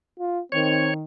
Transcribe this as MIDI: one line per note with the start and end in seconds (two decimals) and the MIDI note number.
0.19 0.41 65
0.52 1.03 51
0.52 0.90 60
0.52 0.94 73